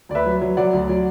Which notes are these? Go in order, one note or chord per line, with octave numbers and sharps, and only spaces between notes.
D2 D5
B4 E5
F#3
F#3
F#3 D5 F#5
D2
F#3